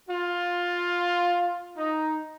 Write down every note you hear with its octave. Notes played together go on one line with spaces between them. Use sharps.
F4
D#4